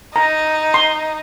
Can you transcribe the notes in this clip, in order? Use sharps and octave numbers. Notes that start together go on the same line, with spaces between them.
D#4 A#5
C6